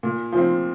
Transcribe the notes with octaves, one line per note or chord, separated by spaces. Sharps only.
A#2
F3 C4